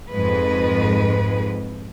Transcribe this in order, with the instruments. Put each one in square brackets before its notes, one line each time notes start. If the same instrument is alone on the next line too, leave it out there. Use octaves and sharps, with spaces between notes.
[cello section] F2 G#2 G#3 B4